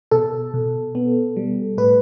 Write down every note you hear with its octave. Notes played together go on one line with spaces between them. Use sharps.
B2 A4
B2
B3
G3
A2 B4